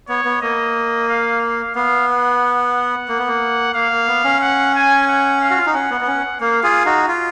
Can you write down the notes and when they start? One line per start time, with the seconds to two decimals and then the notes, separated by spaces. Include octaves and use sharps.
0.09 B3 C#5
0.25 B3
0.41 A#3 D#5
1.09 F5
1.42 F5
1.75 B3 F5
2.09 F#5
3.08 A#3
3.19 B3
3.28 A#3
3.74 A#3 F5
3.92 A#3
4.07 B3
4.24 C#4
4.41 F#5
4.75 G#5
5.07 F#5
5.41 F5
5.50 F#4
5.58 F4
5.66 D#4
5.74 C#4 F#5
5.90 B3
6.01 B3
6.08 C#4
6.40 A#3 F5
6.63 F4 G#4
6.86 D#4 F#4
7.08 F4